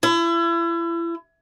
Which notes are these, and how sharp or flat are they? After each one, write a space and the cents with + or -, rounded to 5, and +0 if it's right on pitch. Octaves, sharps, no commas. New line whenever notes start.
E4 +35